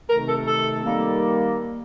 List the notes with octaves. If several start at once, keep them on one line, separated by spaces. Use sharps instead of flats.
C3 D#3 A3 A#4
A4
A4
D#3 G3 A#3